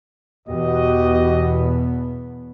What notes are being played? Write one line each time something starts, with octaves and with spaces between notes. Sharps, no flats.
E2 B2 B3 F#4 G4 D#5